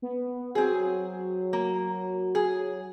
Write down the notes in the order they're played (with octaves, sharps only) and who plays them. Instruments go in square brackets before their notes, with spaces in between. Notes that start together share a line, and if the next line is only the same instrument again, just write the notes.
[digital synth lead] B3
[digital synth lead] F#3 [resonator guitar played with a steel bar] C4 G#4
[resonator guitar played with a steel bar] A#3
G#4